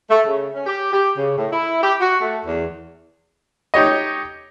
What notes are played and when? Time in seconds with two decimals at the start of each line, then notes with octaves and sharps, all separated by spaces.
0.10 A3
0.26 C#3
0.53 C#4
0.66 G4
0.92 G4
1.17 C#3
1.37 A2
1.52 E4
1.83 G4
2.01 F#4
2.21 A3
2.45 E2
3.74 D#4 G4 C#5 D#5